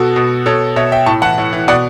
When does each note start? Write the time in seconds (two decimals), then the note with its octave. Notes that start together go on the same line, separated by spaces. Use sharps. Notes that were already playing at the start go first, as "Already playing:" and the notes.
Already playing: B2 F#4 A4
0.16 B2
0.46 B2 A4 C#5
0.76 B2 C#5 E5
0.92 E5 G5
1.06 A2 A5 C#6
1.22 E3 F#5 A5
1.38 A2
1.53 E3
1.68 B2 D5 F#5